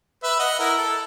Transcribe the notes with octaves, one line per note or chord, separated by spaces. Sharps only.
B4 E5
D#5 F#5
E4 A#4
A4